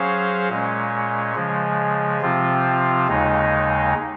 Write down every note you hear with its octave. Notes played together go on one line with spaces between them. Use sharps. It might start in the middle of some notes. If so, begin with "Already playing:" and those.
Already playing: F#3 C#4 G#4 C5 F5
A#2 G#3 C#4
C#3 F3 G#3
C3 F3 C4 F4
D#2 C#3 G#3 D#4